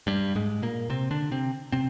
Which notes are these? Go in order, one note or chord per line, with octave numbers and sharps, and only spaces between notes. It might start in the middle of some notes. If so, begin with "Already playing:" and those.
G2 G3
G#2 G#3
A#2 A#3
C3 C4
D3 D4
C3 C4
C3 C4